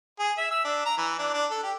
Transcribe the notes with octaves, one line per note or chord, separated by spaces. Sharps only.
G#4
E5
E6
D4
A#5
E3
D4
D4
A4
G4